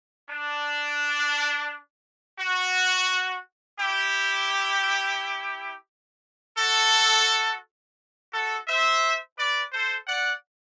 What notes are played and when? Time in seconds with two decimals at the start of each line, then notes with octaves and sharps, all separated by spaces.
0.29 D4
2.39 F#4
3.79 E4 G4
6.58 F#4 A4
8.32 F#4 A4
8.68 C5 E5
9.38 B4 D5
9.72 A4 C5
10.07 D5 F#5